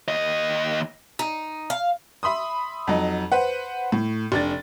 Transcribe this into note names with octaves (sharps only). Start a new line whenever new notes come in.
D#2 D#5
D#4
F5
E5 B5 C6 D#6
F2 F#3 D#4
B4 C5 F#5
A2
F1 D4 A6